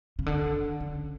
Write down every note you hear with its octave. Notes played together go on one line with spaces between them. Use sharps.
C#3
D3
C#3